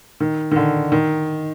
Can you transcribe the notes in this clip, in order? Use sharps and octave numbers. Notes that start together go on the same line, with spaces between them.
D#3
D#3
D3
D#3